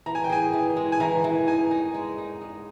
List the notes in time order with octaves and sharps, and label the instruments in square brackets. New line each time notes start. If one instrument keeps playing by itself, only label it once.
[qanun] E3 [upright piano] A#5
[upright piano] G#5
G5
[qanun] G#4 [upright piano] G#5
[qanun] E3
G#3
[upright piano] G#5
[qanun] E3 [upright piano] A#5
[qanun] E3
[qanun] D#4 [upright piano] G#5
[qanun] D#4
G#3
D#4
G#3